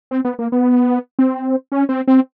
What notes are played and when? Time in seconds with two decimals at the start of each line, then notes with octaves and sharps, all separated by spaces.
0.11 C4
0.25 B3
0.39 A#3
0.52 B3
1.19 C4
1.72 C#4
1.89 C4
2.08 C4